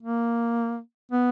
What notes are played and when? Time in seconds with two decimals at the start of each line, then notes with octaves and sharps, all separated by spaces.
0.03 A#3
1.12 B3